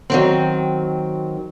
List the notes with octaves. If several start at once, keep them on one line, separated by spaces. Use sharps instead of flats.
D#3 F#3 C4